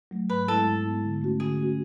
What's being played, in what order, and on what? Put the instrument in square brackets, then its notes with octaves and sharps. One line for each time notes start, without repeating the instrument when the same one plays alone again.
[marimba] F#3 A3
[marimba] G#2 [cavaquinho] B4
[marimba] G#3 B3 E4 [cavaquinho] A4
[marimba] G#2
G#3 B3 E4
D3
A3 C#4 F#4
[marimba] D3 [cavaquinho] G#4
[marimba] A3 C#4 F#4